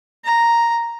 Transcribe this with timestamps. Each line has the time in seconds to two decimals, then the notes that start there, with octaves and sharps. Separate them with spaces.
0.24 A#5